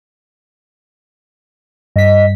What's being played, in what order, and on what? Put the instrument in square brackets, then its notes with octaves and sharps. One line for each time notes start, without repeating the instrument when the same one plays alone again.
[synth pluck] G2 B6 [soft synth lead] D#5